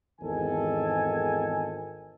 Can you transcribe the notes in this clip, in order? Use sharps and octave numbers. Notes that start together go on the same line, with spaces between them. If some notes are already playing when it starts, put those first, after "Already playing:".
G#1 E2 D#3 A4 G#5